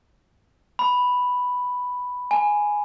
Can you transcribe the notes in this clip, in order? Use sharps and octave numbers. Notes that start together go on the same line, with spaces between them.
B5
G#5